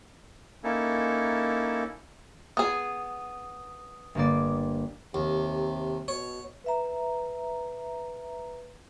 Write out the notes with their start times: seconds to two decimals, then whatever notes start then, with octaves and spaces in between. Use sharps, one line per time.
0.64 A#3 C#4 D#4 E4 A4
2.57 B3 G#4 D#6
4.15 G1 A#3 D5
5.14 D#2 C3
6.08 B2 C#5
6.64 B4 E5 A#5